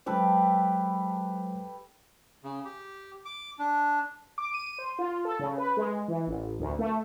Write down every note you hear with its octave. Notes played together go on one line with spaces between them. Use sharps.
F#3 G#3 G4 A4 B4 C5
C#3
G4
D6
D4
D6
D#7
C5
F4
A4
C#3
B4
G#3
E3
A1
D2
A3